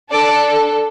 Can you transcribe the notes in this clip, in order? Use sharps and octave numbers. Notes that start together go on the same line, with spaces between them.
D4 A4 D5